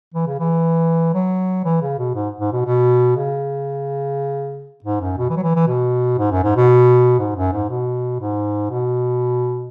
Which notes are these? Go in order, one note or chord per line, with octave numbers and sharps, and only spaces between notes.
E3
C#3
E3
F#3
E3
C#3
B2
G#2
G#2
B2
B2
C#3
G#2
F#2
B2
E3
F#3
E3
E3
B2
G#2
F#2
G#2
B2
G#2
F#2
G#2
B2
G#2
B2